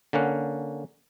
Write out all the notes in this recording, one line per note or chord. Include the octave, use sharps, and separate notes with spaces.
D3 A#3 C#4 F#5